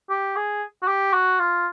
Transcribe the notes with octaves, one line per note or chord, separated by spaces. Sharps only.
G4
G#4
F#4
G4
F#4
F4